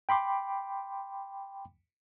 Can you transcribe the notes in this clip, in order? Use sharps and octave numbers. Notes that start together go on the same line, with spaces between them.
G5 B5 C6 D6